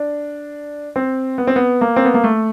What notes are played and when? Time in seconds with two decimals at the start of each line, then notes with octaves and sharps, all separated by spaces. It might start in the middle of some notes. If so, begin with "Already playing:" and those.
Already playing: D4
0.96 C4
1.38 B3
1.47 C4
1.56 B3
1.81 A#3
1.96 C4
2.05 B3
2.14 A#3
2.24 A3